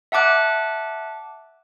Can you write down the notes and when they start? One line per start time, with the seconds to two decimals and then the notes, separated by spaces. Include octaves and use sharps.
0.12 E5 F#5 A5 D6 F#6